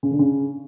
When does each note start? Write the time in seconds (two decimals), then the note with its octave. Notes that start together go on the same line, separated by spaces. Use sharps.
0.03 C#3
0.11 D3
0.19 C#3